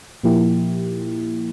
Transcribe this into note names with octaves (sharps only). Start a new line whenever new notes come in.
A#2 F3 A#3 E4 G4